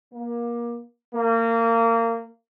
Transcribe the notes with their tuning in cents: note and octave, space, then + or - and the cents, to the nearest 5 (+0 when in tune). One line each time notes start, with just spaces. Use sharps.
A#3 +25
A#3 -25